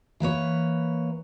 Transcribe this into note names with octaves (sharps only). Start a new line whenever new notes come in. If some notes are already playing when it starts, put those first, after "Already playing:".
E3 A#3 B4 C#5